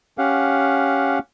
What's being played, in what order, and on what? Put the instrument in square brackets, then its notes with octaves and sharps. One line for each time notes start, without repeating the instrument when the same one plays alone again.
[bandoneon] C#4 G4 F5 F#5